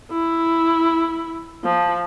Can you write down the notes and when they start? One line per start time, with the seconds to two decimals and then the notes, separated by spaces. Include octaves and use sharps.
0.12 E4
1.64 F3